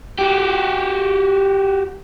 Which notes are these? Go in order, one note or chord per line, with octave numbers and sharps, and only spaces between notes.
F#4 G4